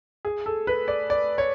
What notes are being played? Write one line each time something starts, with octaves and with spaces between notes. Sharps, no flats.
G#4
A4
B4
D5
D5
C#5